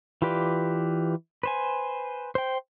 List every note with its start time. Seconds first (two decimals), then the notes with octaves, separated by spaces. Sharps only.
0.22 E3 F4 G4 B4 D5
1.43 B4 C5 G#5
2.35 C5 G5